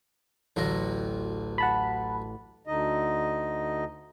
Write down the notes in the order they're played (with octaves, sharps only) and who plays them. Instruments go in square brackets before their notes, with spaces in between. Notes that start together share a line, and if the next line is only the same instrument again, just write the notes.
[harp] A1 A#6 [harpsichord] D2 F#3 F4
[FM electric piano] F#5 A5 B5
[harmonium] D2 D3 D#4 D#5